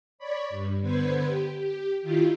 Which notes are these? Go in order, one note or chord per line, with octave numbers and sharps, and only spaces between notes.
C#5 D5 B5
G2
D3 B3 B4 C5 G#6
G4
G4
D#3 E4 F4 G4